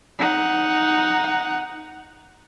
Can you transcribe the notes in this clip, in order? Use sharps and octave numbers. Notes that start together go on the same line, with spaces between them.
D#4 F#5